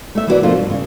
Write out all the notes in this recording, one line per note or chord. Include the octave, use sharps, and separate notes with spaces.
A3 E5
E3 A#3 E4 F#4 B4 D5
B2 F3 A3 A#3 D4 F4
G2
C#3